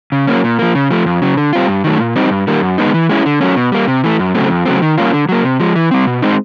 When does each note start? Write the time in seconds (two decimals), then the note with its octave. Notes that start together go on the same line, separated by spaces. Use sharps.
0.12 C#3
0.27 F#3 A#3 C#4
0.44 A#2
0.59 F3 A#3
0.75 C#3
0.91 F3 A3
1.06 F2
1.22 C#3 F#3
1.37 D3
1.53 G3 C4 F4
1.69 G2
1.84 D#3 F#3 A3
2.00 A#2
2.16 G3 C4 D#4
2.31 G2
2.47 D#3 G3 A#3
2.63 F#2
2.78 D#3 G#3 B3 D#4
2.94 E3
3.09 G#3 C#4 E4
3.26 D3
3.41 F#3 A3 C#4
3.56 B2
3.72 G3 A#3
3.88 C3
4.04 E3 A3
4.19 F#2
4.35 C#3 F#3 A3 C4
4.50 F2
4.66 C#3 F#3 A3 C4
4.82 D#3
4.98 G3 A#3 C#4 F4
5.13 D3
5.29 F#3 A#3
5.44 C3
5.60 F3 G#3
5.76 E3
5.91 G3 C4
6.07 B2
6.22 G#3 C4 D#4